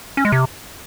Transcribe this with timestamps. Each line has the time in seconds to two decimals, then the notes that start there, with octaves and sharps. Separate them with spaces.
0.17 C#4
0.25 G#3
0.32 C3